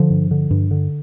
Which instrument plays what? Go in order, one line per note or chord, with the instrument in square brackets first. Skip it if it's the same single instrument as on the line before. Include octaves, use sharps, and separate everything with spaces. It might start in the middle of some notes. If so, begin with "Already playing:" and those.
Already playing: [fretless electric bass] D3 F3
G2
D3
G2
D3